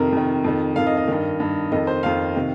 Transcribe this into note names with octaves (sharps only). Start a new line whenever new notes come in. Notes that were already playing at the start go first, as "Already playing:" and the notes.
Already playing: F2 C3 D#3 A#4
F2 C3 D#3
F2 D#3
F2 D#3 F5
D#5
D#5
G2 D#3
G2 D#3
F2 D#3 D#5
C5
F2 D#3 F5
C3 D#3